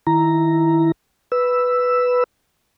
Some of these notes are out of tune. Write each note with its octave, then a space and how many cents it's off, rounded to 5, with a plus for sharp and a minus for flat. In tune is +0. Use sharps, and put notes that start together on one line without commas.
D#3 +20 E4 +0 A#5 +0
B4 +0 E6 +0